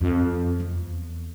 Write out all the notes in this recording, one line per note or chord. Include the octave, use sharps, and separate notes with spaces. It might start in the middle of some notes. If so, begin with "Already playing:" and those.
F2
E2